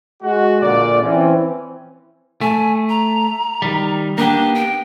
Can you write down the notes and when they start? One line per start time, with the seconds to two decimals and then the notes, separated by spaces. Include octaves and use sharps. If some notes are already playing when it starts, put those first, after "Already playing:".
0.22 G#3 F#4
0.62 A#1 A#2 D3 D5
1.02 E3 C4 C#4
2.41 A3 G#5
2.89 A#5
3.62 D#3 G3
4.18 A#3 B3 D4 G4
4.55 G5